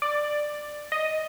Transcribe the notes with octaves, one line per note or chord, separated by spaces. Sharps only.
D5
D#5